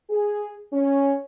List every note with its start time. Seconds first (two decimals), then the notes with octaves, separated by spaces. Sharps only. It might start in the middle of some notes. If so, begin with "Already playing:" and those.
0.10 G#4
0.72 C#4